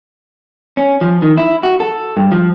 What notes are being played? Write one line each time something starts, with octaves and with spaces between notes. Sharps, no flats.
C#4
F3
D#3
E4
F#4
A4
G2
F3